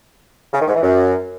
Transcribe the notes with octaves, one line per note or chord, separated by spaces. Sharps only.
C#3
D#3
G#2
E3
F#2